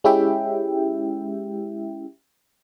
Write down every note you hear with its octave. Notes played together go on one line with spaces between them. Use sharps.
G#3 C#4 E4 G4 E5 G5